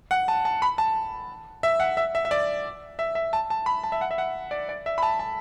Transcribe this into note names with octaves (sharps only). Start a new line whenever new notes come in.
F#5
A5
A5
B5
A5
E5
F#5
E5
E5
E5
D5
E5
E5
A5
A5
B5
A5
E5
F#5
E5
F#5
D5
D5
E5
B5
A5
A5